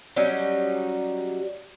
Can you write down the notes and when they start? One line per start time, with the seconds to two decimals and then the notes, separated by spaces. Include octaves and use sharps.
0.16 F#3 G3 C#4 D#4